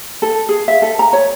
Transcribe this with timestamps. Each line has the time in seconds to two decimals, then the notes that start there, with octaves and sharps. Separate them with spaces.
0.22 A4
0.49 G#4
0.68 E5
0.82 A4
0.99 A#5
1.13 C#5